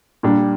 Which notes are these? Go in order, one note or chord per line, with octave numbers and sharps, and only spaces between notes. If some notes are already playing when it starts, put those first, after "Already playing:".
A#2 G3 D4